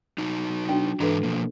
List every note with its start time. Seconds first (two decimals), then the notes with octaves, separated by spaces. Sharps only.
0.18 F#3 D#4
0.69 D4 F#4 G5
1.00 G#2 E3 D4 A4 B4 A#5
1.23 B2 F3 A#3